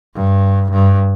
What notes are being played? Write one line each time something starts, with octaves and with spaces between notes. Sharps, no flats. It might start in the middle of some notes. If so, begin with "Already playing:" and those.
G2
G2